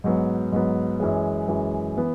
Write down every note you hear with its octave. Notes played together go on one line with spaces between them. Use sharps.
G#2 F#3 B3
G#2 F#3 B3
F#2 E3 G#3
F#2 E3 G#3
E3 B3